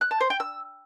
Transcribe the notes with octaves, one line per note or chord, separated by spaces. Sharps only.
F#6
A5
C5
G5
E6